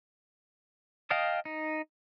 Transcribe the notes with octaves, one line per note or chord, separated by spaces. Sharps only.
D#5 F5 G5 A5 D#6
D#4